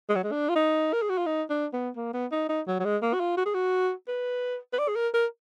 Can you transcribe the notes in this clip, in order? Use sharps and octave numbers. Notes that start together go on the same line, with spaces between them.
G#3
F#3
G#3
D4
F4
D#4
A#4
G#4
F#4
F4
D#4
D4
B3
A#3
B3
D#4
D#4
F#3
F#3
G#3
A#3
F#4
F4
F#4
G#4
F#4
B4
B4
D5
G#4
A#4
A#4